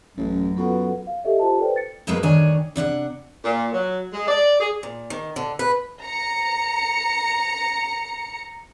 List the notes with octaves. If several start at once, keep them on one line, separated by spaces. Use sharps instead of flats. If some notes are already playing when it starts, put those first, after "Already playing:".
A1 F#2
B2 F4 F#4 A4 B4 F#5
F5
G4 A4 D#5 E5
F4 G4 C5 A5
A4 B4 C5 D5 G5
A6 C#7
F2 F#3 G#3 A#3 D#4 B4
D2 D#3 D4 C#5 G#5
C3 D4 E5 F#5
A#2
F#3
G#3
D5
G#4
A#2
D#3
D3
B4
A#5 C#7